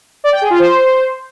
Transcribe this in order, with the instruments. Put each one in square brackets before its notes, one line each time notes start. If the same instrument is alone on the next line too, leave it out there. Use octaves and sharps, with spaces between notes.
[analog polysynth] D5
G5
G#4
F4
C5